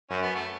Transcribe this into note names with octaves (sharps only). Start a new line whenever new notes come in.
F#2 C#4
B3
A3